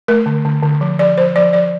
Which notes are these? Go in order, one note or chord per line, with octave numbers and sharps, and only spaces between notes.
A3 A#4
D3
D3
D3
F3
F3 D5
F3 C5
F3 D5
F3 D5